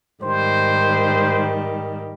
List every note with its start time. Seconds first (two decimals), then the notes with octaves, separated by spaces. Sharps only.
0.23 G#2 D#3 G3 C5